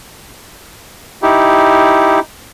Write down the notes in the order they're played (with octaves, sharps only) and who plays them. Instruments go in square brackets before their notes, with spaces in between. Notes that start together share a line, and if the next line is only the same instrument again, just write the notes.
[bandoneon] D#4 E4 G4